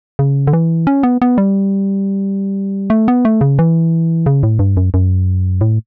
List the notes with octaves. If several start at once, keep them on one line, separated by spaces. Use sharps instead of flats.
C#3
D3
E3
C#4
B3
B3
G3
A3
B3
A3
C#3
E3
C#3
A2
G2
F#2
F#2
A2